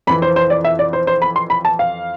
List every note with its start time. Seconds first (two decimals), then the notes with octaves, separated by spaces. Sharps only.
0.07 F2 E3 B5
0.22 C5
0.36 C5
0.50 D5
0.65 E5
0.79 D5
0.93 C5
1.07 C5
1.22 B5
1.36 C6
1.50 B5
1.65 A5
1.79 F5